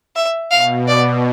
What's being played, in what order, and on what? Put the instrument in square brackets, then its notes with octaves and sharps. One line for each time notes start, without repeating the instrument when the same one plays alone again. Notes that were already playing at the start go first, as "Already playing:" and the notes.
[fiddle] E5
[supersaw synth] B2 [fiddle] F5
[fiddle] D5